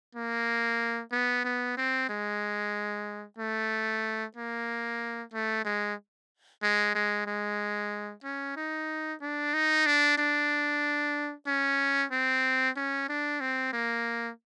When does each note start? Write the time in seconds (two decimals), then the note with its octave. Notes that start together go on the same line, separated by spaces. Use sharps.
0.15 A#3
1.12 B3
1.45 B3
1.77 C4
2.09 G#3
3.38 A3
4.36 A#3
5.33 A3
5.65 G#3
6.63 G#3
6.95 G#3
7.27 G#3
8.24 C#4
8.56 D#4
9.21 D4
9.54 D#4
9.86 D4
10.18 D4
11.47 C#4
12.12 C4
12.77 C#4
13.09 D4
13.41 C4
13.73 A#3